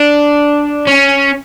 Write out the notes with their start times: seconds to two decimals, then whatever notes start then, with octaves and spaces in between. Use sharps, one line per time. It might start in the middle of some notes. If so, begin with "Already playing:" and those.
Already playing: D4
0.87 C#4